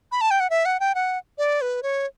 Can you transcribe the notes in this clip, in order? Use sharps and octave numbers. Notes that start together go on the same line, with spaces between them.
B5
A5
G5
F#5
E5
F#5
G5
F#5
D5
B4
C#5